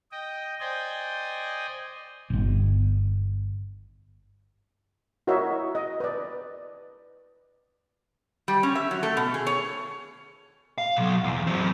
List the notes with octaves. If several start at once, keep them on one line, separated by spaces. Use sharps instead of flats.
D#5 G5
C5 D5 D#5 G5 G#5
D1 G1
E4 F#4 A#4 C#5 D#5 E5
D#5
B4 D5
G3
C#4
E5
F#3
A3
B2
G#4
C#5
F5
B1 F#3
E2
F#3 C4